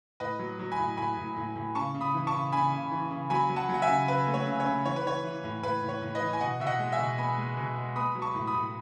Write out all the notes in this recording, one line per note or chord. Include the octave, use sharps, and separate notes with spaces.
A2 B4 D#5
F#3
F#3
G#5 B5
A2
A2 G#5 B5
A2
A2
A2
C#3 A5 C#6
C#3
B5 D#6
E3
A5 C#6
C#3
C#3 G#5 B5
C#3
E3
C#3
F#3 G#5 B5
F#3
F#5 A5
F#3
F#5
E5 G#5
C#3
C#3 B4
A3
C#5
C#3
C#5
C#3
E3 C#5
B4
E3 C#5
E3
A2
A2 B4
A2
C#5
A2
B4 D#5
E3
G#5
B2 D#5 F#5
B2 E5
D#5 F#5
G#3
E5 G#5
B2
B3 G#5 B5
G#3
B2
G#3
B3 B5 D#6
F#3
A5 C#6
A2
B5 D#6
A2